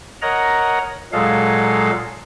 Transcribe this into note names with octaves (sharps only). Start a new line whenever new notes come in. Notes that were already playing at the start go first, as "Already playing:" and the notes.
A#4 C#5 D#5 F#5 A#5
A#2 F#3 G#3 G#4 A4 F5